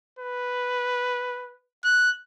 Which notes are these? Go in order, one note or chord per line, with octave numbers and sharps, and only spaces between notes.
B4
F#6